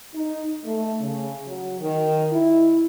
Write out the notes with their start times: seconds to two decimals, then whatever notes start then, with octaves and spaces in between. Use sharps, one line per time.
0.14 D#4
0.65 A3
1.00 C#3
1.46 F#3
1.80 D#3
2.31 E4